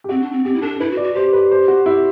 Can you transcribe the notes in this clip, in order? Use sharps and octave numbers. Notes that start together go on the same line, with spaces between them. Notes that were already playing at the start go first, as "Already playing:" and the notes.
G4
C4 F#4
D4
C4
C4 G4
E4
D4 A4
E4 B4
F#4
D5
F#4
G4 C5
B4
C5
F#4
E4